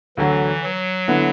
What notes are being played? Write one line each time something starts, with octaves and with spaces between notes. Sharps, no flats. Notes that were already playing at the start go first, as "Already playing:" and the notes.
D2 D3 E3 F#3
F#3
D3 B3 E4